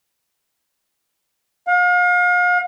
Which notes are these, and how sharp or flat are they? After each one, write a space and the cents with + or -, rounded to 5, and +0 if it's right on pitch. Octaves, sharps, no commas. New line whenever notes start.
F5 +40